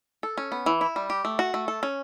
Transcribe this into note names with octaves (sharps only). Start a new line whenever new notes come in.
A4
C#4
B3
E3
E4
G3
G4
A3
F#4
A3
A4
C#4